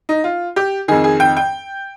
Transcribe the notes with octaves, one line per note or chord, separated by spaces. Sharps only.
D#4
F4
G4
F2 D#3 G#4
G#4
G5
G5